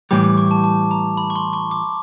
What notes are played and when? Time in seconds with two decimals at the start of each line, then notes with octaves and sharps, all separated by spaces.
0.11 A2 E3 G3 D6
0.24 D6
0.37 C#6
0.51 A5
0.64 A5
0.91 A#5
1.17 B5
1.30 C#6
1.36 C6
1.53 C#6
1.71 D6